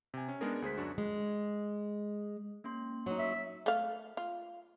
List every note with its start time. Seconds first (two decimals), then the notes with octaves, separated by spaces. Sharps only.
0.14 C3 G#5
0.29 C#4
0.41 G#3 B3 D4 D#4 G#4 A#4
0.62 D2 G#4 C5 B6
0.77 F#2 D4 F#4
0.98 G#3
2.64 A#3 C#4 C6
3.06 F#3 D#4
3.19 E5
3.66 A3 F5
4.17 F4